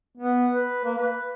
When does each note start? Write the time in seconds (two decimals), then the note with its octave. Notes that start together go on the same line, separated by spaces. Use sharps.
0.18 B3
0.53 B4
0.85 A#3
0.98 B4